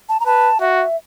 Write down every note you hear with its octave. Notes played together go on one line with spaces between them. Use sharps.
A5
A#5
B4 A5
F#4 E5